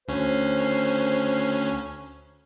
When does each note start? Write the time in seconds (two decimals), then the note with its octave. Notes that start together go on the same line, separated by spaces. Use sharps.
0.08 D2 C#4 C5